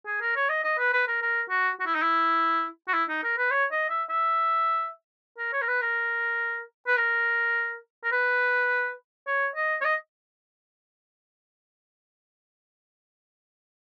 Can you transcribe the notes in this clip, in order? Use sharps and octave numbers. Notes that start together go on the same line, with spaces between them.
G#4
A#4
C#5
D#5
D#5
B4
B4
A#4
A#4
F#4
F#4
E4
D#4
E4
F#4
E4
D#4
A#4
B4
C#5
D#5
E5
E5
A#4
C#5
A#4
B4
A#4
B4
A#4
A#4
B4
C#5
D#5
C#5
D#5